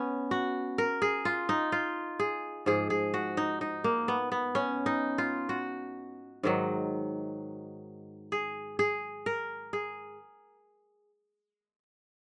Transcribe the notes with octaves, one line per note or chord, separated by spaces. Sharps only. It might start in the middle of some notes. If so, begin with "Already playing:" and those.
Already playing: B3 C#4
F#4
A#4
G#4
F4
D#4
F4
G#4
G#2 F3 G#4
G#4
F#4
D#4
D#4
A#3
B3
B3
C#4
D#4
F4
F#4
G#2 D#3 F#3
G#4
G#4
A#4
G#4